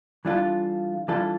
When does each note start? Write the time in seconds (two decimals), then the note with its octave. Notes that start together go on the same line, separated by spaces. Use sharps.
0.25 E3 G3 D4 F4 A4
1.08 E3 G3 D4 F4 A4